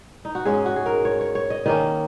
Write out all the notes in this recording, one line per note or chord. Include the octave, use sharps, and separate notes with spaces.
D#4
F#4
G#2 G#3 C#4 G#4
F#4
G#4
A#4
C#5
C#5
C#5
D#5
D#3 A#3 C#4 D#5